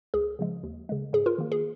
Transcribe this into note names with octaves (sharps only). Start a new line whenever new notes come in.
C#2 G#4
C#3 F3 G#3
D#2
C#3 G#3
G#2 G#4
F4 A#4
D#3 A#3
G#4